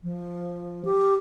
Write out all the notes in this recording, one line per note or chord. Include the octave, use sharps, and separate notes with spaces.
F3
G4